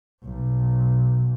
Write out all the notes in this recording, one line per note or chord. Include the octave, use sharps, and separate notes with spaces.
B1